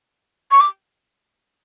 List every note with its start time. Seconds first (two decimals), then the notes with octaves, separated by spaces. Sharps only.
0.51 C#6
0.60 D6